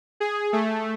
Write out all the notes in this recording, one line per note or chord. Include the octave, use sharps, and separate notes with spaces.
G#4
A3